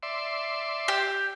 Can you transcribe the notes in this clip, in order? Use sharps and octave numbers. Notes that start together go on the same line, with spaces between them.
D5 E5 C6
G4